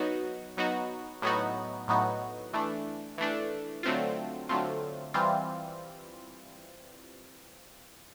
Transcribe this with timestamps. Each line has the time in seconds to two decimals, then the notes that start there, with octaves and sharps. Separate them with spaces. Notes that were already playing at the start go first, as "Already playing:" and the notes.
Already playing: F#3 B3 D#4 F#4
0.58 F#3 B3 D#4 F#4
1.22 A2 F#3 B3 D#4 F#4
1.88 A2 F#3 B3 D#4 F#4
2.53 E3 A3 D4
3.18 E3 A3 D4
3.83 D3 F#3 A3 C4 F4
4.49 D3 F#3 A3 C4 F4
5.14 E3 G3 C4 F4